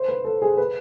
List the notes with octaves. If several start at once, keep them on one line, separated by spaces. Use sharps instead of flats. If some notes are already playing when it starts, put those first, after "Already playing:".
Already playing: C5
B4
A4
G#4
B4